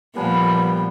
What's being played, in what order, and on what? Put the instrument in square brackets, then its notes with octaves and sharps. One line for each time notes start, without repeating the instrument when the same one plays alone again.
[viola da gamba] A#2 F3 [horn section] G3 B3 [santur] B4 G#5 A5